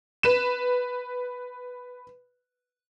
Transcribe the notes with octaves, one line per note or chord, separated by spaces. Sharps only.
B4 E7